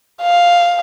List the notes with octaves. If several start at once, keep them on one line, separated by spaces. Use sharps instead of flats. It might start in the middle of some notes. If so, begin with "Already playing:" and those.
F5